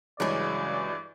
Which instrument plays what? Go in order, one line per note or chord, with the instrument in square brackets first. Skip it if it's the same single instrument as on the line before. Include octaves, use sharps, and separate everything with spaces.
[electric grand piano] G2 E3 [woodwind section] C#3 [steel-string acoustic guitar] F#3 G#3 [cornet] D5